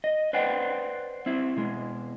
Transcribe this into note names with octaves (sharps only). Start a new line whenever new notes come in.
D#5
B4 C5 D5 F#5 G5
C4 E4
B2 G#3